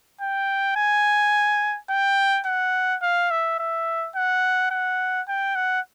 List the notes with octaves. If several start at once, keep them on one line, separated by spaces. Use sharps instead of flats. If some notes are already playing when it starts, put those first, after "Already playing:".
G5
G#5
G5
F#5
F5
E5
E5
F#5
F#5
G5
F#5